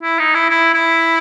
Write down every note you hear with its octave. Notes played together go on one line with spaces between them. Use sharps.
E4
D#4
E4
E4
E4